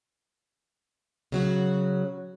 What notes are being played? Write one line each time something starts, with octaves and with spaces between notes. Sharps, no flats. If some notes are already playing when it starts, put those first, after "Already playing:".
C#3 F#3 F#4